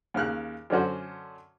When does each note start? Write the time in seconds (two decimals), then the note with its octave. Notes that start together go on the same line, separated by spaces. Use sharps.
0.14 D#2 C#3 F6 F#6
0.70 F#2 D3 C#4 F#4 C5